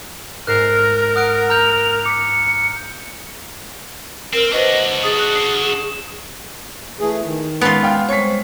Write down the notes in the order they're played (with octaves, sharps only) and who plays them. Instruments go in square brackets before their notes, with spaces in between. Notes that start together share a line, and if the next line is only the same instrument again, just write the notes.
[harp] G#2 A4 C7 [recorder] A#4 [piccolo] F6 [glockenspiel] F#6
[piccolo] F#5 [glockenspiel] D#6 F#6 D7
[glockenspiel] A#5 F6 G6 [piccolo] F7
[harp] D6 B6 [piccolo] C#7
[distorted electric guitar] C4 [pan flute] A#4
[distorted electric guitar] D4 F#4 [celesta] B4 C5 [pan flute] D#5
[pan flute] G#4 [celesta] D#6 A6
[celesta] F#6
C7
E7
[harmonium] E3 A3 G#4
D#3
[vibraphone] G#3 C#4 F#5 [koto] B3 F4
[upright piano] F5 G5 F6
[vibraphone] G3 G#3 C5 [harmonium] C4 [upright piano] C#5 B6